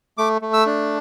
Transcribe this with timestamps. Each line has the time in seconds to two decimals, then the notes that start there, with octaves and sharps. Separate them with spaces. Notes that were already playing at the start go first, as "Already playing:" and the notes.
0.18 A3 D6
0.42 A3
0.53 E6
0.66 D4